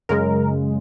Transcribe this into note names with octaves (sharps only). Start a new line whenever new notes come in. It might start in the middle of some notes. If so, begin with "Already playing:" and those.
F#2 C#3 G#3 A#4